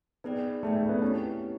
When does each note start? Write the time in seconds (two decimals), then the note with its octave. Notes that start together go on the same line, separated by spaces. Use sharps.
0.24 B3 D#4 G#4 B4 D5 G5
0.63 A3 D#4 G#4 B4 D5 G5
0.76 A3
0.89 B3
1.02 C4 C#4 E4 G4
1.41 C4 E4 G4